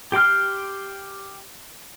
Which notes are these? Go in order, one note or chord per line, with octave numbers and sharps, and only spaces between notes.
G4 G5 C6 F6